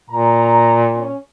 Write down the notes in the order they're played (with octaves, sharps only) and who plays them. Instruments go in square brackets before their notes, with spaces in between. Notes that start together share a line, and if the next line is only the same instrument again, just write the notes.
[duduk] A#2 [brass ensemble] A#5
[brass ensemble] C#4